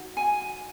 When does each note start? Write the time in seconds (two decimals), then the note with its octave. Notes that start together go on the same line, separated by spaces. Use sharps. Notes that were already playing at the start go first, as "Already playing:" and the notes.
Already playing: D#4 F#4
0.17 G#5